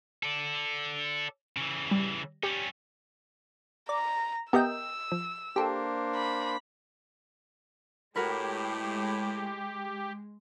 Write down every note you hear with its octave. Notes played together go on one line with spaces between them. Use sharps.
A4 D5
C#3 E3
G3
G3 C#4 G4
D5 A#5
B3 G4 A#4 D#5 E5 G5 E6
F3
A#3 D4 G4 A4 C5
B5
A2 G#3 F#4 G4 A#4 B4